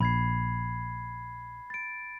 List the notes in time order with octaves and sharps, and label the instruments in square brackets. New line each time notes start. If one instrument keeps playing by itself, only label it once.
[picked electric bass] A#1 [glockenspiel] B5 G#6 C7
[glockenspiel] A6 D7